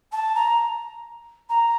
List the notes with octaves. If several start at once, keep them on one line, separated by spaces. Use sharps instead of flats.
A5
A#5
A#5